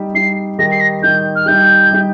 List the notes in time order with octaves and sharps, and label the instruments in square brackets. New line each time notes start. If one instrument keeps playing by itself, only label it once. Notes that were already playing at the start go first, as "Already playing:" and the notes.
Already playing: [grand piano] G3 D#4 G4
[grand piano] G3 D#4 G4 [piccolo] C7
[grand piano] D#3 G3 D#4 G4 [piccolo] A#6
[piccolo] C7
A#6
[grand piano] D#3 G3 D#4 G4 [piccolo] G6
[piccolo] F6
[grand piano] G3 D#4 G4 [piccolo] G6
[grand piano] G3 D#4 G4